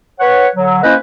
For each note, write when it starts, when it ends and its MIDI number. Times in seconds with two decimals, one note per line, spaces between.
0.20 0.48 71
0.20 0.48 73
0.20 0.48 78
0.56 0.80 50
0.56 0.80 54
0.83 0.94 58
0.83 0.94 61
0.83 0.94 64
0.83 0.94 71
0.83 0.94 72
0.83 0.94 75